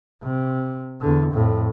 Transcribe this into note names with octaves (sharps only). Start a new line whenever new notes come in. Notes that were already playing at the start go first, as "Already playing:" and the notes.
C3
E2 D3
F2 A2